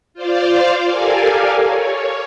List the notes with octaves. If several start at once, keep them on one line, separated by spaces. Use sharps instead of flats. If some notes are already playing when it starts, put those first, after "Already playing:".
F4 C5 D5 F5
G4 A4 A#4 D5 F5 G#5
C#5